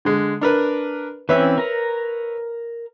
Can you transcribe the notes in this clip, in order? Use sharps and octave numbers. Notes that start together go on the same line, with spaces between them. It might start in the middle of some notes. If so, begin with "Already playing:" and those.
D3 G#3
D4 A#4 B4
E3 C4 C#4 B4 C#5 E5
A#4 A#5